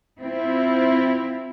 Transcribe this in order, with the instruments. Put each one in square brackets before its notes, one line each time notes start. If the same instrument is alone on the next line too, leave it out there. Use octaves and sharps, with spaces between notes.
[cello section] C4 E4 F4